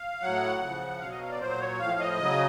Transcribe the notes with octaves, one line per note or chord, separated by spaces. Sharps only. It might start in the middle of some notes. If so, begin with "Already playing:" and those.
Already playing: F5
A2 F#3 F#5
C#3 F3
B2 F#3 F5
D#5
F5
D5
A#2 F#3 C5
C#5
A2 F3 F5
D#5
C#3 F#3